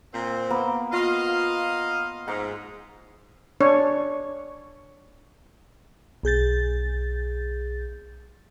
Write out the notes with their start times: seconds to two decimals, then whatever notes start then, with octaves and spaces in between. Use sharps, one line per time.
0.13 A#2 C4
0.50 A#3 B3
0.93 F4 D#5 F5
2.28 G#2 A#5
3.61 D4 C#5
6.23 B1 G#4 G6 A6